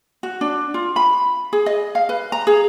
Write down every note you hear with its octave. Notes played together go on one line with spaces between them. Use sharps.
F#4
D4
F4
B5
G#4
D#5
F5
B4
A#5
G#4